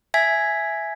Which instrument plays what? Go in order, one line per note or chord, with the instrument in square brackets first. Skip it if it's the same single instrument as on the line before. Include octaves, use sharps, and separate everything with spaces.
[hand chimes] E5 G#5 G#6 B6